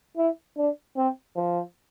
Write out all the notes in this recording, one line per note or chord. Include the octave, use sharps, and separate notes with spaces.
E4
D4
C4
F3